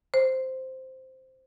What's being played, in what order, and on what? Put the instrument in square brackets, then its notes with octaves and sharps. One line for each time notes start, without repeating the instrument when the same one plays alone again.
[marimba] C5